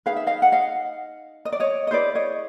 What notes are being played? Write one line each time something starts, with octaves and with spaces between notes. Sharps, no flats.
D#4 G#4 B4 F5
E5
D#5 F5
F#5
D#5 F5
D#5
D5
C#5 D#5
D#5
E4 G#4 B4 C5 D5
C#5 D#5